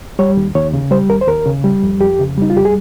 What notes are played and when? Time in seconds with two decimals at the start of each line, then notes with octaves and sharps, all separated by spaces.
0.19 G3 C#5
0.37 D#2
0.55 D#2 C#5
0.73 C#3
0.91 G3 C5
1.09 D#2 A#4
1.21 C5
1.28 D#2 A#4
1.46 C#3
1.64 G3
1.83 F2
2.00 F2 G4
2.19 C#3
2.38 G3 D#4
2.50 F4
2.55 F2 G4
2.65 G#4